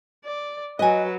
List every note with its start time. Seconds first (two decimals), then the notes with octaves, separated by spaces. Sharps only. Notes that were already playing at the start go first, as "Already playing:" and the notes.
0.25 D5
0.79 F#3 B4 D#5 G#5